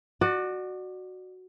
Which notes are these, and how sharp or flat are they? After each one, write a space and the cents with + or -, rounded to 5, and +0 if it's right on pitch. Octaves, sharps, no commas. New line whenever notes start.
F#4 +0 D5 +30